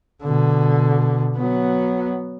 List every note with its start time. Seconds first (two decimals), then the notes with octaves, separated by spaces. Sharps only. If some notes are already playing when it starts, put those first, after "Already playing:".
0.24 B2 D3
1.37 F#3 B3